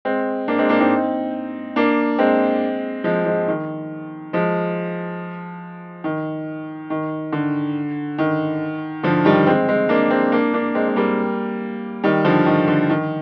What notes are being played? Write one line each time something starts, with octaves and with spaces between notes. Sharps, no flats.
G#3 C4
A#3 D4
G#3 C4
A#3 D4
C4 D#4
A#3 D4
G#3 C4
F3 G#3
F3 G#3
D#3
F3 G#3
D#3
D#3
D3
D#3
D3 F3
D#3 G3
G#3 C4
G#3 C4
A#3 D4
G#3 C4
A#3 D4
A#3 D4
G#3 C4
G#3
G3 A#3
D#3 G3
D3 F3
D#3
D3
D#3